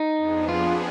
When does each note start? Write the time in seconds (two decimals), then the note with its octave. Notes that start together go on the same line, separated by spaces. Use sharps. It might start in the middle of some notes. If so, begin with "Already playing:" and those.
Already playing: D#4
0.17 F2 F3 B3 D4 G#4
0.49 F4